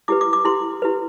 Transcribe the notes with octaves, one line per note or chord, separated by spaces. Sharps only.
E4 G4 B4 D6
D6
D6
E4 G4 B4 C6
E4 G4 B4